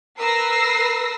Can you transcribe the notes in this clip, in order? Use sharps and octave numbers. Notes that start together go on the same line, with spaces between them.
A#4 B4 E6 A#6 C7